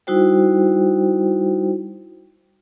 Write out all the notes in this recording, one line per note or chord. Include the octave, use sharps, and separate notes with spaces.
G3 D#4 E4 F#4 C5 G5